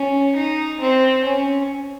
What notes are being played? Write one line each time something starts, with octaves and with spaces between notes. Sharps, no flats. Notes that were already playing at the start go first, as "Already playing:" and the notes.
Already playing: C#4
D#4
C4
C#4